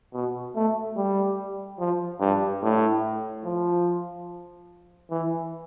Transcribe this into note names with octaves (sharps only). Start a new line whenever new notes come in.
B2
A3
G3
F3
G2
A2
F3
E3